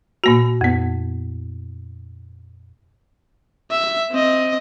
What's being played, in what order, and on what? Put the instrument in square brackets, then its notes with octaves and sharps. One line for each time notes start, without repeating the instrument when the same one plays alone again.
[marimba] A#2 A#3 F#4
F2 B3
[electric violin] E5
C4 D#5